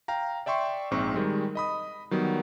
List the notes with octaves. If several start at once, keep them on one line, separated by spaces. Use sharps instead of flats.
F5 G5 A#5
D5 E5 G5 C6 C#6
A#1 G#2 C4 C#6
D#3 G3 G#3
D#5 B5 D#6
D#3 F#3 G3 B3